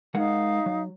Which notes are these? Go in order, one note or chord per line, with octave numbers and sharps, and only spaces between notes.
G#3 D#4 A#4 F5 F#5
F#3